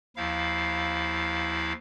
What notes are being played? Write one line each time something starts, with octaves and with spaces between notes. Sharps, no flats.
D#2 F3 E4 F5